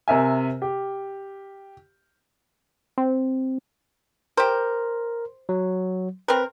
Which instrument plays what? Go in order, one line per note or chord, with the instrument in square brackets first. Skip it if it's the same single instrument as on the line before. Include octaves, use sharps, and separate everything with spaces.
[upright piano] C3 A#4 E5 G#5
G4
[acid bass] C4
[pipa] G4 C5 [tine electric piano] A#4
[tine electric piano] F#3
[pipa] C4 A#4 [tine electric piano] B4